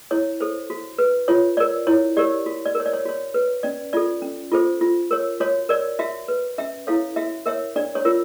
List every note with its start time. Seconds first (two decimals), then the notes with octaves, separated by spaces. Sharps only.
0.11 E4 C#5
0.41 A4 C5
0.70 F#4
0.99 B4
1.28 F4 C#5
1.57 A#4 C#5 D5
1.87 E4 C#5
2.17 G4 A#4 C#5 D5
2.46 F#4
2.65 D5
2.75 A#4 C#5
2.86 D5
2.93 C#5
3.05 F#4 C#5
3.34 B4
3.63 C#4 D5
3.93 F4 A4 D5
4.22 C#4
4.52 F4 A4 C5
4.81 F4
5.11 A#4 C#5
5.40 F#4 C#5
5.69 A#4 C#5 D5
5.99 F#4 E5
6.28 B4
6.58 C#4 E5
6.87 E4 A4 C#5 F5
7.16 F#4 E5
7.46 A#4 C#5 E5
7.76 D4 D5
7.95 C#5
8.05 F4 A#4